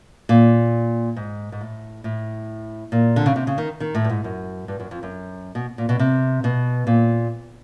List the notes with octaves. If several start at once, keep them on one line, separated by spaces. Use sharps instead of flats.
A#2
G#2
G#2
A2
A2
A#2
D3
C#3
C3
C#3
D#3
D#3
A2
G2
G#2
F#2
G2
F#2
F2
F#2
B2
A#2
B2
C3
B2
A#2